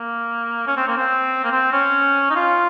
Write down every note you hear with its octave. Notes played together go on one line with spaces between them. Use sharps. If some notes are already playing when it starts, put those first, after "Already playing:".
Already playing: A#3
C#4
C4
A#3
C4
A#3
C4
C#4
D#4
F4